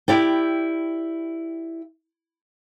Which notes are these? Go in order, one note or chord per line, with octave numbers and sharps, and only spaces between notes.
E4 G4 D5 G5